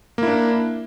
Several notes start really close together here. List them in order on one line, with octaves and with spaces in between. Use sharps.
A#3 E4 D4